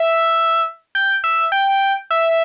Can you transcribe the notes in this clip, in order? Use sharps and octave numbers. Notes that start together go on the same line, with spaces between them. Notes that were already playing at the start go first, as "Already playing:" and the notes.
Already playing: E5
G5
E5
G5
E5